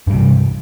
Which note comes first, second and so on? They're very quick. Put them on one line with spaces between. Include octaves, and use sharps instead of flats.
G2 G3 C3 E3